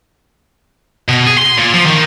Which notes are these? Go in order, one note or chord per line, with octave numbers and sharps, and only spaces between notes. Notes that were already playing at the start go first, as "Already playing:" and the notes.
B2
G#4
C6
A#2
F3
D#3